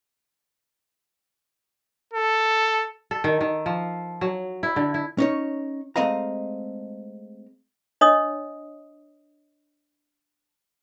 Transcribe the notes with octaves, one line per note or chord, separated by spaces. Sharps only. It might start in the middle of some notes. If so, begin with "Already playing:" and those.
A4
A4
D#3
D#3
F3
F#3
E4
D3
E4
C#4 D#4 C#5
G#3 A3 C4 D#5 F5 A#5
D4 C#5 D#5 D#6